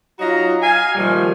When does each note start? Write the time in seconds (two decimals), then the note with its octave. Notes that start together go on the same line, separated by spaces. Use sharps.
0.19 F#3 D#4 F4 F#4 A#5
0.61 F5 G#5
0.95 A#2 D#3 F3 G3 A3